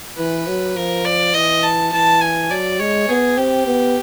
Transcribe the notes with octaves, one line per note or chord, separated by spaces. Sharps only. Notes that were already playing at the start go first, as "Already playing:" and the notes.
E3 B4
F#3
F3 A#4
D5
E3 D#5
A5
E3 A5
G#5
F#3 D5
G#3 C#5
B3 G#4
C4 G4
B3